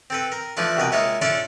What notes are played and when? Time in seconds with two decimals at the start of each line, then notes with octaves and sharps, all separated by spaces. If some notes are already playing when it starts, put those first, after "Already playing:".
0.10 C4 A4 B4
0.32 A#4
0.57 E3 F3 A3 D4 E4 F4
0.77 C2 B2 A#4 B4
0.92 G#3 A#3 E4 F4 C#5 E5
1.21 C#4 D4 E4 F4 A4 D5